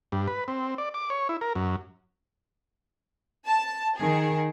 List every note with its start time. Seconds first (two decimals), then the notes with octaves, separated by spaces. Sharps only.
0.12 G2
0.28 B4
0.48 C4
0.78 D5
0.94 D6
1.10 C#5
1.29 E4
1.41 A#4
1.55 F#2
3.46 A5
3.97 D#3 G#4